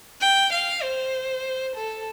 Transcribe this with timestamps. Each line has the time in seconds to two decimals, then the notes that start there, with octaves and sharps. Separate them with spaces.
0.21 G5
0.53 F5
0.83 C5
1.76 A4